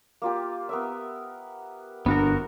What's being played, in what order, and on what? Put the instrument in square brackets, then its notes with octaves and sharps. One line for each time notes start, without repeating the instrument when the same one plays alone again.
[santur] A#3 F4 G4
B3 A#4 E5
[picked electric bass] G1 D4 [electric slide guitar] B3 F#4 A#4